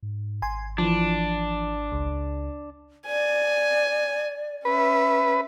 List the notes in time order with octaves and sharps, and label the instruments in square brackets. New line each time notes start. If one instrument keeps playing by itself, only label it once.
[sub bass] G#2
[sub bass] G#1 [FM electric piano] G#5 C6
[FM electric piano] E3 F3 [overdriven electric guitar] D4
[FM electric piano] C#2
[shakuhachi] D5 [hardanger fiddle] G#5
[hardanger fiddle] C#4 E5 [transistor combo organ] B4